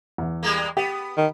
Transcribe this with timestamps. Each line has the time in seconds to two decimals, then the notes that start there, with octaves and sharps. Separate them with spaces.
0.18 E2
0.43 G3 G#3 A#3
0.77 B3 G4
1.17 D#3